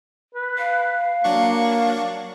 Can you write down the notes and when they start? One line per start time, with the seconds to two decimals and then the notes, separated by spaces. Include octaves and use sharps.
0.35 B4
0.58 F5
1.24 F#3 A#3 D4 C#6